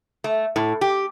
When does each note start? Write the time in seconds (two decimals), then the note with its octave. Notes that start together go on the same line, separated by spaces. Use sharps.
0.24 A3
0.56 A2
0.81 G4